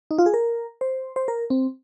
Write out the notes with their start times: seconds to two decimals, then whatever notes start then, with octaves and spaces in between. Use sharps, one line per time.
0.11 D#4
0.18 F4
0.26 G#4
0.34 A#4
0.81 C5
1.16 C5
1.28 A#4
1.50 C4